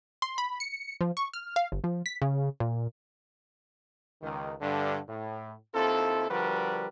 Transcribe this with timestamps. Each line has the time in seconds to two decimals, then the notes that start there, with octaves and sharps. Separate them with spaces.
0.22 C6
0.38 B5
0.60 C#7
1.01 F3
1.17 C#6
1.33 F6
1.56 F5
1.72 G1
1.84 F3
2.06 B6
2.22 C#3
2.60 A#2
4.22 C#2 D#3
4.61 G2 D3
5.08 A2
5.74 D#2 C4 E4 F4 A4
6.30 D3 F3 G3 F#4 A#4 B4